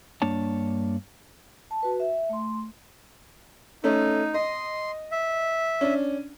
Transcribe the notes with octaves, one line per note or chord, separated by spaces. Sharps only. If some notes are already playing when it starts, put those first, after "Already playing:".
G2 A#3 D4 C#5 A5
A5
F#4 B4
E5
A3 C6
A3 C#4 D#4
D#5 C6
E5
C#4 D4